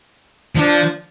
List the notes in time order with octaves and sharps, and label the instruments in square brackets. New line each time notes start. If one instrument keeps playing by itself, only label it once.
[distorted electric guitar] F3 [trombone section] D4